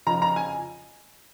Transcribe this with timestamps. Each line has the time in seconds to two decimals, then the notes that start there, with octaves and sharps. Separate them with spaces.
0.07 F2 C#3 F3 A#5
0.22 A#5
0.36 G#5